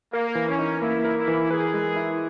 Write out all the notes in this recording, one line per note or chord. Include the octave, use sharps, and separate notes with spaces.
A#3 A#4
E3
C#4
D#4
A#3 E4
A#4
E4
E3
G#4 B4
G#3
E4